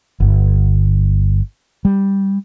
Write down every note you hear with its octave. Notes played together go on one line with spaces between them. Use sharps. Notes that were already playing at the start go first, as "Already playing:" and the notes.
G1
G3